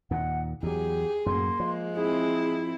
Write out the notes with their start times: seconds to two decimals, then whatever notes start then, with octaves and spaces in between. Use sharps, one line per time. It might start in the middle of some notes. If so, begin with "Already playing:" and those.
0.11 D#2 A#2 F#5
0.63 E2 F#3 G4 G#4
1.26 F#2 A2 F#3 A#3 C6
1.60 F3 G#3
1.94 C4 E4 G#4